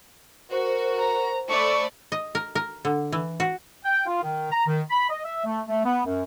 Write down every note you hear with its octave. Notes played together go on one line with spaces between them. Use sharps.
F#4 A#4 C5
A#5
A3 D5 B5 C#6
D#5
A#4
A#4
D3
E3
F#4
G5
F4
D#3
A#5
D#3
B5
D#5
E5
A3
A3
B3
F#2